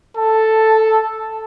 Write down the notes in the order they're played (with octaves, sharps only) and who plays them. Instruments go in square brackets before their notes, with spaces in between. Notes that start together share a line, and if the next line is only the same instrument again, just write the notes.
[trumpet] A4 [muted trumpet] A5